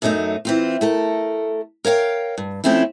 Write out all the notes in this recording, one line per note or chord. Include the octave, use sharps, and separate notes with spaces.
F#2 F#3 A3 D4 D#4
E3 C4 F4
A3 A4 A#4
A#4 C#5 F5 G5
G2
F3 A3 C4 C#4 E4